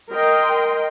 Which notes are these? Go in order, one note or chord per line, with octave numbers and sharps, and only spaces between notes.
A#4 D#5 G5 C6